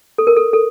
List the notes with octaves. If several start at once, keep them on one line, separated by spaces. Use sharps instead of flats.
A4
A#4
A4
A4